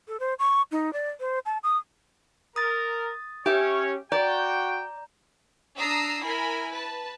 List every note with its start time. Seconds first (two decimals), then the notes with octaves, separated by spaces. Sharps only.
0.08 A4
0.20 C5
0.39 C#6
0.72 D#4
0.93 D5
1.20 C5
1.46 A5
1.63 D#6
2.56 A#4 D#6 A6
3.46 C#4 G4 C#5 E5
4.12 F#4 D5 G5 A#5 G6
5.77 D4 A#5 D#6 E6 C7
6.23 E4 A#4 G#5 B5
6.71 B4 A5